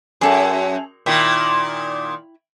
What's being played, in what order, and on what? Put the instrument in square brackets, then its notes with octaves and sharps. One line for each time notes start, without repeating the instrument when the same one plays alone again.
[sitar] F#2 [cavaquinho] G#4 A4 C#5
[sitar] A#2 D#3 [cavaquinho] E4 G5 C#6